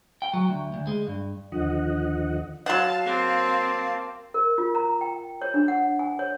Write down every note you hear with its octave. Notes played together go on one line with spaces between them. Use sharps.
G5
F#3
D2
D2
G#3
G2
D#2 D3 F3 D#5 F#5
F#3 F5 F#5 A5
A#3 C4 A5
A#4
F4
A#5
G5
C#5
D4
F#5
G#5
C#5